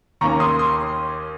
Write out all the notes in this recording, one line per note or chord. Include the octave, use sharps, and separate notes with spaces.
D#2 D#3 A#3 C#4 A#5 C#6
C6 D#6
C6 D#6